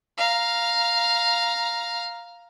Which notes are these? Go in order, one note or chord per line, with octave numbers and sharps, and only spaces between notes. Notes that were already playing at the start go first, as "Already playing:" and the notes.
F5 A#5